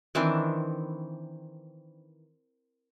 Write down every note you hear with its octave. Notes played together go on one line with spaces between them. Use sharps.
D#3 E3 C4 D4